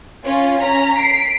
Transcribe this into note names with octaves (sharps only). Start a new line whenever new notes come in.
C#4 F4
C#4 A#5 B6
B6 C7 D7